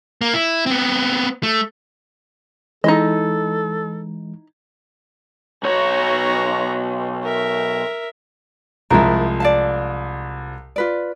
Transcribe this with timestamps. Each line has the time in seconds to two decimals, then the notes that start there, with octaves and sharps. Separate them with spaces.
0.21 A#3
0.33 E4
0.66 B3 C4
1.43 A3
2.84 E3 G#3 D#4 E4 A4 D#5
5.63 B1 F#4 C#5 A#5
7.23 A#4 E5
8.90 C2 F3 G#3 E4 A#4
9.40 D5 F5 A5
10.76 F4 B4 D5